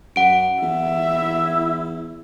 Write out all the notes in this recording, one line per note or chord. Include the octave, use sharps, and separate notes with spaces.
F#2 F#5 D7
E2 E5
E4